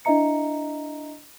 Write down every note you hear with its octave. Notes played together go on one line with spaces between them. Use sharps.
D4 E4 D#5 E5 A#5 C#7